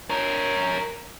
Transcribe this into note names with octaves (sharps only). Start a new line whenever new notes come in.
A#4 C#5